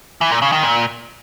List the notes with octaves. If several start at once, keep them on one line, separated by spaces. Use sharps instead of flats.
E3
A#2
C#3
D#3
A#2